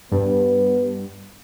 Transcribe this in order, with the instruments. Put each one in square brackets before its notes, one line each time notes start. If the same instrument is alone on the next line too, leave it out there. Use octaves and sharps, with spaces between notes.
[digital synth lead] G2 [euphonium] B3